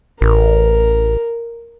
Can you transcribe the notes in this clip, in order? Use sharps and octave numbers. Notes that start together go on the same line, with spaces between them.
A1 A#4